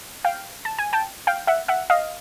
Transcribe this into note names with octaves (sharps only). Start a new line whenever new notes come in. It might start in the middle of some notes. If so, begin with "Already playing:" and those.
F5 G5
A5
G#5
G5 A5
F5 G5
E5 F#5
E5 F#5
D#5 F5